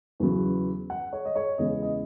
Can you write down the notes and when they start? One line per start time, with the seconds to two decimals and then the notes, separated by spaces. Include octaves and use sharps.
0.20 E2 C#3 F#3 B3
0.90 F#5
1.13 C#5
1.25 D#5
1.36 C#5
1.58 E2 C#3 G#3 B3 D#5
1.82 D#5